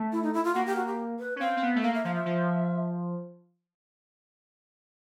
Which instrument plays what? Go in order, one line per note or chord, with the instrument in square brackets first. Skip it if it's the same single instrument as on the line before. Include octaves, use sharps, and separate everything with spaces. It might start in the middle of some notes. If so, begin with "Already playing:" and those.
Already playing: [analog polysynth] A3
[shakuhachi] E4
D#4
E4
F4
[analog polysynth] A#3 [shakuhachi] F#4
[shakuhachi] G4
F#4
G4
B4
[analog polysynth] C#4
[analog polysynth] C4 [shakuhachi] F5
[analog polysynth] C4
B3
A3
[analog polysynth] A#3 [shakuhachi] F5
[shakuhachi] E5
[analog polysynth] F3 [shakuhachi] F5
[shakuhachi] E5
[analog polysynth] F3